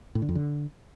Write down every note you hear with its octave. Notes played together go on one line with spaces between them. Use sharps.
A2
D3
F2
D3